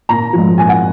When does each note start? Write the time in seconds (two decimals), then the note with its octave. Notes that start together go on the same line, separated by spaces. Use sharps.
0.09 A#2 A#5
0.33 F3 G#3
0.57 A#2 G#5
0.69 F#5